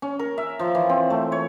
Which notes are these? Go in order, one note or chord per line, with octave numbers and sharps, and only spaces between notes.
C#4
A#4
E5
F3
E3
C4
A3
C#5